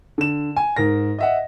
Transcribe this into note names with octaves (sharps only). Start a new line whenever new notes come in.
D3 E7
G#5
G#2 A#4 A#6
D#5 E5 F#5